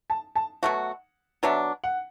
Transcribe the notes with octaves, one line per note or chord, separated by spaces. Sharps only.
A5
A5
B2 F#3 A3 F#4 F#5
B2 F#3 D4 E5
F#5